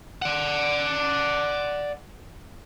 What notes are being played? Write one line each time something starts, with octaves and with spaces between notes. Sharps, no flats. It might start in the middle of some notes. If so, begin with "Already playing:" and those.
D5 F#5